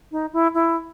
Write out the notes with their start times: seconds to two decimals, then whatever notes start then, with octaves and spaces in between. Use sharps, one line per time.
0.11 D#4
0.33 E4
0.54 E4